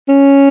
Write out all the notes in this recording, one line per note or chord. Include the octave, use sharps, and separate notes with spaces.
C#4